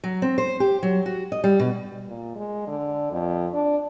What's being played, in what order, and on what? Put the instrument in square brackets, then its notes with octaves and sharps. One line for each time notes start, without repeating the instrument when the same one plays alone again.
[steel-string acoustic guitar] F#3
C4
C5
G4
F#3
F#4
D#5
G3
B2
[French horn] A#2
G#3
D3
F2
D4